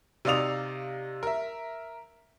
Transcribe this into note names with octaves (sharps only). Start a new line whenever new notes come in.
C3 D#4 D5 F5 D#6 F7
A#4 E5